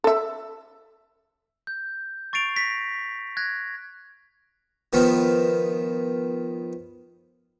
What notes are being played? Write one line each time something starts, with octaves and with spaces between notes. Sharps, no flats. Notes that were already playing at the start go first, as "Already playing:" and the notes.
A4 E5
G6
C#6 A6 C7 D7 F7
A#6 B6
F#6 G#6 A#6
D#3 F3 B3